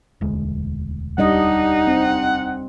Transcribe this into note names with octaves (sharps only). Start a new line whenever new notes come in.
E1 D2 G#3
G3 D4 D#4 D#5 F#5
C4